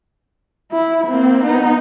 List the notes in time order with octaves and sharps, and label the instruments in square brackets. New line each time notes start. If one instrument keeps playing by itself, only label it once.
[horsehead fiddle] E4
A#3 C4
B3 D#4